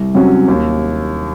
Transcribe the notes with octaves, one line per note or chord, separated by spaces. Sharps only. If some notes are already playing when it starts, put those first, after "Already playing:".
Already playing: C2
C3 F#3 C#4 F#4
D#2